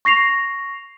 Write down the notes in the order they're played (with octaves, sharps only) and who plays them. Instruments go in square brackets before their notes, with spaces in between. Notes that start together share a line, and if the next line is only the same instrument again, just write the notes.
[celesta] C#6 A#6 C7 F7